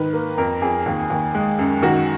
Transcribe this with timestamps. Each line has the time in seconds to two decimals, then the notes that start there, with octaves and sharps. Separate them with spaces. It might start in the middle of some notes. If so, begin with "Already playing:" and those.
Already playing: G#2 D#3 B4
0.13 A#3
0.38 F2 A#4
0.62 F2 G#4
0.86 D#2
1.10 D#2
1.35 G#3
1.59 F#2
1.82 D#3 F#4